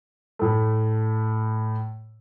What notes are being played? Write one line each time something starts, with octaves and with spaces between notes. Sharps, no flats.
A2 A3